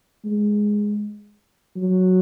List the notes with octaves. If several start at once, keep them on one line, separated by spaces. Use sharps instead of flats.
G#3
F#3